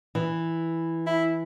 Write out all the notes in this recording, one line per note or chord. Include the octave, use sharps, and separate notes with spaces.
E3
E4